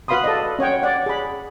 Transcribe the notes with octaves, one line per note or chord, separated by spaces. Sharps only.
F#4 B4 F5 B5 C6 D#6
A4 D5 D#5
C#4 C#5 F#5 G5
D5 F#5
G#4 B5